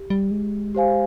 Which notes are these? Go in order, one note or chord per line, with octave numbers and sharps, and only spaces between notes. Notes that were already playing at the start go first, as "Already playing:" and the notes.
Already playing: G4
G3
G#3
G4 C5 F5 G#5